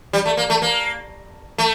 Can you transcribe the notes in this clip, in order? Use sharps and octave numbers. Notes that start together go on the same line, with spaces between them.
G3
A3
A#3
A3
A#3
A3